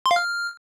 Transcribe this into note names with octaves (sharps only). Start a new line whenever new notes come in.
C6
F5
F6